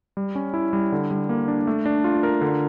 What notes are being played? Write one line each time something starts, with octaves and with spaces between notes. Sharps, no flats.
G3
C#4
E4
G3
D3
G3
A#3
D4
A3
D4
F4
A#4
D3